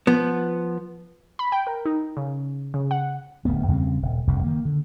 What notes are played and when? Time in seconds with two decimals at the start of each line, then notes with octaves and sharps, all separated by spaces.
0.07 F3 B3
1.39 B5
1.52 G5
1.67 A#4
1.86 D#4
2.17 C#3
2.74 C#3
2.91 F#5
3.45 D1 D2 A3 B3
3.68 E2 C#3 G3 C4
4.02 D#1
4.27 F1 C2 G2 C#3
4.44 D#3 A#3
4.65 D3